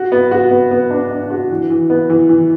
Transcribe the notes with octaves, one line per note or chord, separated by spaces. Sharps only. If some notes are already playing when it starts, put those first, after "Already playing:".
Already playing: F#4
B3
F#4
B3
B3
D4
D4
F#4
E3
E3
B3
E3
E3